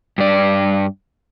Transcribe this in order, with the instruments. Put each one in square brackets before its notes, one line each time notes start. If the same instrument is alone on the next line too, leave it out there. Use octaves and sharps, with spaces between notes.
[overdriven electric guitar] G2 D5